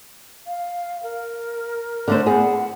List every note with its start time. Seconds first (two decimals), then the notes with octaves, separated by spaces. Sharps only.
0.47 F5
1.03 A#4
2.08 D3 A3 C5
2.26 B3 G#4 F#5